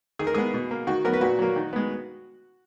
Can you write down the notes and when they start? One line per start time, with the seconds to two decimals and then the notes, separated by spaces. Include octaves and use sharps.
0.19 D#3 G#4
0.27 A#4
0.34 G#3 B3 G#4
0.54 B2
0.71 A#3
0.87 D#3 F#4
1.04 F#3 B3 A#4
1.14 B4
1.21 A#2 F#4
1.39 F#3 A#3
1.56 D#3
1.73 G#3 B3